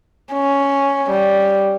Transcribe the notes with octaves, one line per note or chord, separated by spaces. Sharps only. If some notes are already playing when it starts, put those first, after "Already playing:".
C#4
G3